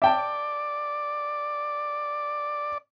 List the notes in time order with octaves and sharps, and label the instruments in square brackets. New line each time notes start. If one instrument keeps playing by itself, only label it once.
[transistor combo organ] D5 [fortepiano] E5 G5 A5